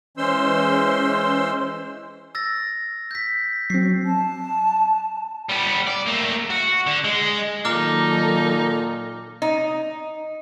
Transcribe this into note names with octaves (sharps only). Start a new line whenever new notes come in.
E3 G#3 C#4 C5 C6 E6
E6 A6 A#6
G6 B6
F#3 C4 C7
A5
G3 B3
D5
A3 A#3
F#4
D3
G#3
A#2 D#3 F#3 D#4 A4 A#5 D6 F6
D#4